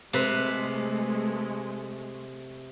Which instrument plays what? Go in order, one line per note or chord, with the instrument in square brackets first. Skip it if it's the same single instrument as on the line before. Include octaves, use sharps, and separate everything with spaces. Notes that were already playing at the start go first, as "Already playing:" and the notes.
[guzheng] C3 B4 [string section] G#3 A3